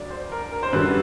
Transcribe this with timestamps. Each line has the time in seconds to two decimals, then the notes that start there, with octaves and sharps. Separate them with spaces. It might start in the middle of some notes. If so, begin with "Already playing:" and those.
Already playing: D2 D3 F#3 D5
0.11 C5
0.32 A#4
0.51 A#4
0.63 C5
0.72 F#2 D3 G3 B4